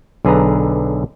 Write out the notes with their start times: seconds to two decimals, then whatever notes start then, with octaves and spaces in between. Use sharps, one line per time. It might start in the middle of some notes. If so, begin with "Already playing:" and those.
0.25 B1 D3 G#4 B4 A#5